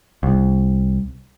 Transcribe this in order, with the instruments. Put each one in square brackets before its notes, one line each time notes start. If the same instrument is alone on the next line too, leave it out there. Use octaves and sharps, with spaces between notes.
[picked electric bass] C2